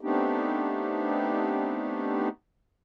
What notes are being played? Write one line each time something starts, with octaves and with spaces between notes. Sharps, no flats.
A3 B3 C4 D4 D#4 G4